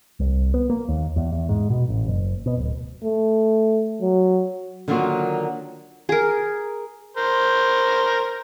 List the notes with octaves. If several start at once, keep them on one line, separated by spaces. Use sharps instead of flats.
C2
B3
A#3
D#2
E2
E2
G#2
B2
A1
F#1
B2
D1
A3
F#3
D3 D#3 F#3 A#3 F4 F#4
G#4 A#4
A#4 C5